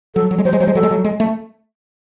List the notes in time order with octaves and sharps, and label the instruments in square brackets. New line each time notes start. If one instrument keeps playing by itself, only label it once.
[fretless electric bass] F#3 [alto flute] A4
[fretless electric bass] F#3
G#3
[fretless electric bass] F#3 [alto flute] C5
[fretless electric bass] G#3
[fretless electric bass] F#3 [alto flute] C5
[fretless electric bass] G#3
[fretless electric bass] F#3 [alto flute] A4
[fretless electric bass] G#3
F#3
G#3
A3